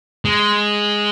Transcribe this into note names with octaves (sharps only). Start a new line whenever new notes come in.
G#3